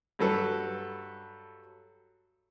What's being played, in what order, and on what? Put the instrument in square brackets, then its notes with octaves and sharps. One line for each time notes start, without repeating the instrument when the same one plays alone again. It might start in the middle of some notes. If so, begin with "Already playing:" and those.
[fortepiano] G2 F#3 A4 B4